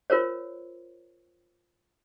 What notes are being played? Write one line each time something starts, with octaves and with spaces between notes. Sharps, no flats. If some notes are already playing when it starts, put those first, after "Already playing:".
F4 A#4 C5 C#5